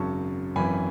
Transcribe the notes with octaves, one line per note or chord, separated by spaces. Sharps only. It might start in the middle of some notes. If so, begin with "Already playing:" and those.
Already playing: G#1 F#2 C#3 F#3 A5 C#6
G#1 F#2 E3 G#5 B5